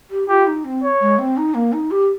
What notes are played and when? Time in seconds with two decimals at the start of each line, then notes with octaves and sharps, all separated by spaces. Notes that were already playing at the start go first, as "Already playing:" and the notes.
0.11 G4
0.28 F4 G4
0.47 D#4
0.65 C4
0.83 C#5
1.01 G#3
1.19 C4
1.37 D#4
1.54 A#3
1.73 D#4
1.91 G4